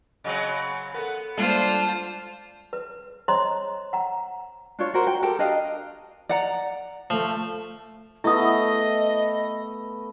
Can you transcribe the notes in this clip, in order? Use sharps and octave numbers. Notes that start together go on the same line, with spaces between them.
C#3 F#3 C4 D#5
B3 A4 A#4
G3 G#3 A#3 D4 F4 A4 C5
B4
C5 C#5 D#5 A#5 C6
F#5 A#5
D4 F4 C#5
F#4 A#4 C5
G5
G4 A4 A#4
D4 D#5 F5
D5 F#5 A#5
F3 A3
A3 B3 E4 D#5 D#6